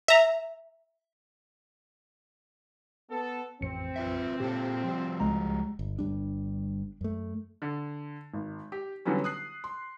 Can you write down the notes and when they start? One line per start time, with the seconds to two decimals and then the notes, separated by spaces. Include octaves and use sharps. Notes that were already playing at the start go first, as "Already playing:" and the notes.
0.08 E5 A#5
3.11 B3 A4
3.61 A1 F2 C4 C#7
3.96 F4 B4 E5
4.40 A#2 F4 G4 A4
4.84 F3 G3
5.20 C#2 G#3 A#5
5.79 G1
5.99 G1 E2 G3 D4
7.01 F#2 A3
7.62 D3
8.34 G#1
8.72 G4
9.05 D3 E3 F#3 G3 B3 C#4
9.24 D#6 F#6 C7
9.64 C6